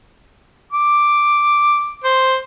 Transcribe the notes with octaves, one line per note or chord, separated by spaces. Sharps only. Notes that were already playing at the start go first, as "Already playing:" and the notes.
D6
C5